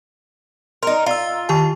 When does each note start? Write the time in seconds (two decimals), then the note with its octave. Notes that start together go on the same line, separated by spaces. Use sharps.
0.83 D#4 A#4 C6
1.06 F4 A#5 E6
1.49 D#3 G4 A5